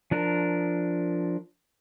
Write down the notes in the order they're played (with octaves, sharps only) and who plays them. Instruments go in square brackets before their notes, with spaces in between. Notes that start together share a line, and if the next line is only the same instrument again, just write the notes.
[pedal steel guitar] F3 D4 A#4